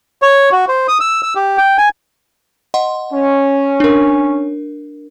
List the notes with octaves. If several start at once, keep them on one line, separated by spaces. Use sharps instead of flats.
C#5
F#4
C5
D#6
E6
E6
G4
G5
G#5
D#5 F#5 C6
C#4
D4 A#4